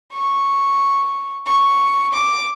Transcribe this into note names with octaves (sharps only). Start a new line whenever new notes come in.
C#6
C#6
D6